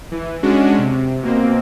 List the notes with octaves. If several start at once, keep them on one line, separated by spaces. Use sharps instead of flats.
E3
G#3 C#4 D4 F#4
C3
B2 A#3 C4